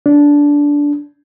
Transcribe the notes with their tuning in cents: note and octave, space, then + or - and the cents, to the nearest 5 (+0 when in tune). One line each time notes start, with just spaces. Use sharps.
D4 -15